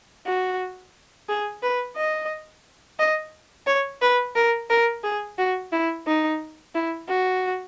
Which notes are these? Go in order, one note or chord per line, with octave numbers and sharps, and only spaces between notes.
F#4
G#4
B4
D#5
D#5
C#5
B4
A#4
A#4
G#4
F#4
E4
D#4
E4
F#4